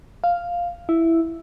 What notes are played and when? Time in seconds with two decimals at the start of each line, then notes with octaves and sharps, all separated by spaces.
0.24 F5
0.89 E4